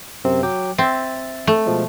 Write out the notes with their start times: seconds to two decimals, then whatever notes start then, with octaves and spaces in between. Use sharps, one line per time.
0.24 F#2 C3 C4
0.43 F#3 G5 D6
0.78 C4 E5 A6
1.47 A3
1.66 B2 F3 G#3